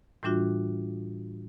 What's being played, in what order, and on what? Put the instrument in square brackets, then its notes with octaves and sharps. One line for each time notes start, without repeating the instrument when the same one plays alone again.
[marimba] A2 E3 G3 D4 F4 F#4